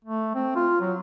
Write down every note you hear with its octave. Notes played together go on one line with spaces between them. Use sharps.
A3
C4
F4
F#3